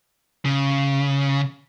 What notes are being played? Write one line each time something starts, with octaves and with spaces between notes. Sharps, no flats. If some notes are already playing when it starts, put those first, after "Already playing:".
C#3